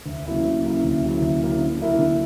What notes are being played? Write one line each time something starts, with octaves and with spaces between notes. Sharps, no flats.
D2
C#3 F#3 A#3 E4
D2
C#3 F#3 A#3 E4
D2
C#3 F#3 A#3 E4
D2
C#3 F#3 A#3 E4
D3
F#3 A#3 E4 A#4
D3